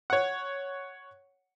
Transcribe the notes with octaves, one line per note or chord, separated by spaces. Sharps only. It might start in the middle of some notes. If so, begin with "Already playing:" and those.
C#5 F#5